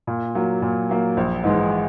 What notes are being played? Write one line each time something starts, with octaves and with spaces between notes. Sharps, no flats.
A#2
F#3 A#3
A#2
F#3 A#3
A#1
G#2 E3 G#3